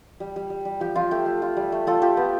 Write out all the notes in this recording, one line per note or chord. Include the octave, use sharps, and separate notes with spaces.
G3
G3
G3
G3
F3 G4
F3 F4
A3 G4
A3
F4
G3
A3
A3 F4 A4
F4 G4
B3